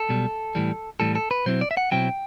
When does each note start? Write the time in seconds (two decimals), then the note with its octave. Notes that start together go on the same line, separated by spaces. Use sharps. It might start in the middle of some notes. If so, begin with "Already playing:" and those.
Already playing: A4
0.09 B1 B2 G3
0.55 A2 E3 G3
1.00 A2 E3 G3 A4
1.15 A4
1.31 B4
1.46 B2 F#3 C4 E4 C5
1.61 D5
1.71 E5
1.77 F#5
1.92 B2 F#3 C4 E4 G5